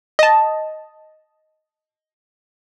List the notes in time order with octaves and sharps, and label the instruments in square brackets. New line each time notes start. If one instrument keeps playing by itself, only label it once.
[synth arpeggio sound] D#5 A5